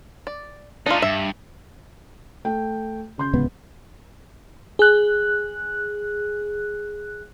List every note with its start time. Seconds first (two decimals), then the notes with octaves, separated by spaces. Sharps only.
0.27 D5
0.86 A3 D4 D#4 F4
1.02 G2 E5
2.45 A3 G5
3.18 C#3 C6 G6
3.33 D1 C#2 B3
4.79 G#4 F#6